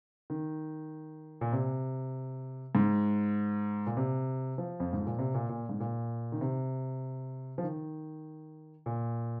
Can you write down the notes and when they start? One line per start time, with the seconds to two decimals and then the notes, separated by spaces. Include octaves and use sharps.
0.30 D#3
1.41 A#2
1.53 C3
2.75 G#2
3.87 A#2
3.97 C3
4.58 F3
4.80 F2
4.93 G#2
5.07 A#2
5.19 C3
5.34 A#2
5.49 A#2
5.69 G#2
5.80 A#2
6.32 D#3
6.41 C3
7.58 F3
7.63 D#3
8.86 A#2